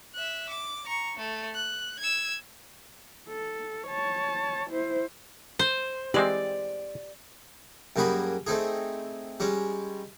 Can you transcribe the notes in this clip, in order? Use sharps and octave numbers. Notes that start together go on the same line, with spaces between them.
E5 F#6
D6
A#5 C#6
A3
F#6
E6 G#6
A4
C#5 A5
E4 C5
C5
E3 G#3 C4 G4 D5
F#2 G3 A#3 F#4 G#4 B5
A3 C4 D#4 G#4
G3 G#3 C#4